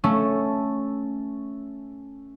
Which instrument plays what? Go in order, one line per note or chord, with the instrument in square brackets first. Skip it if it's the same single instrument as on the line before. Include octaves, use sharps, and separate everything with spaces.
[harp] A3 C#4 A4